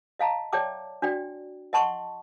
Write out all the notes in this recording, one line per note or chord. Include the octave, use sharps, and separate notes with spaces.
D#5 F5 A5 A#5
C#5 D5 E5 G5 A5 D6
D4 F#4 D5 G5
D#5 F#5 A5 C6 C#6